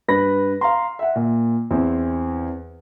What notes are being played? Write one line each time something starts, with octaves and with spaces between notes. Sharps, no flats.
G2 B4 B5 A#6
F5 A#5 C6
E5 F#5
A#2
E2 C4 E4